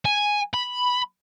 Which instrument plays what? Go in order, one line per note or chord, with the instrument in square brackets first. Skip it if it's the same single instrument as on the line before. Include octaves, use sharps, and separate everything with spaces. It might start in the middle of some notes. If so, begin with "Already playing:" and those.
[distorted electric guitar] G#5
B5